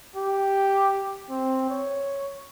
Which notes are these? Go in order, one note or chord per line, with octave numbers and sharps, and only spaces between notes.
G4
C4
C#5